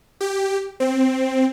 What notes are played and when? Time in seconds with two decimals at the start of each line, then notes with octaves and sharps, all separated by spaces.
0.21 G4
0.80 C4